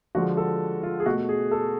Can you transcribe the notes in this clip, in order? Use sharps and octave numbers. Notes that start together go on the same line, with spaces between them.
D3 F3 G#3 F#4
A4
F4
G#4
B2 A3 F#4
G#4
A4